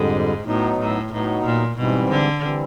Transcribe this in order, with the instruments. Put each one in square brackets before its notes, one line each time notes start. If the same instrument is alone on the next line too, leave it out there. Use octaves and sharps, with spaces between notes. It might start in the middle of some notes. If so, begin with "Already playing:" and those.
Already playing: [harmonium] F2 D3 G3 [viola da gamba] G#2
[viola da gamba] A2 [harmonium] F#3 B3 D#4
[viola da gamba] A2
[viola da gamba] A2 [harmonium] F#3 B3 D#4
[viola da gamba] A#2
[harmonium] G#2 E3 G3 C4 [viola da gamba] B2
[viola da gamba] D3
[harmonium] E3 G3 C4